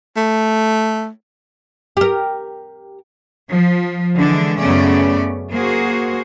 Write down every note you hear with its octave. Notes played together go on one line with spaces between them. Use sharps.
A3
G4 A#4
F3
D3 E3 G#3 D4
F#2 C#3 A3 B3 C#4 D5
A#3 F#4 G#4 C5